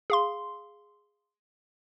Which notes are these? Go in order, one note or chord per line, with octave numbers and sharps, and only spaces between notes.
G#4 F5 C6